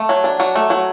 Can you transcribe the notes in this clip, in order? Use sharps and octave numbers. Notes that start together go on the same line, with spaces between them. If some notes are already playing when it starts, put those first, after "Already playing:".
Already playing: A3
F#3
D4
F#3
A3
F#3